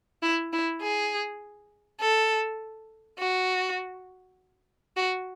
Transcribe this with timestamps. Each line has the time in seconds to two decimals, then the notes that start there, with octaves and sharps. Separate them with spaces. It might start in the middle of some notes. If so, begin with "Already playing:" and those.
0.22 E4
0.53 E4
0.82 G#4
2.00 A4
3.19 F#4
4.97 F#4